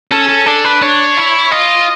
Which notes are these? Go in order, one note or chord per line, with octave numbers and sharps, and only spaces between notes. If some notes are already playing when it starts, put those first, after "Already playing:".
C#4 A4
A4
D4 A4
B4
D4 C#5
E4
F4 D#5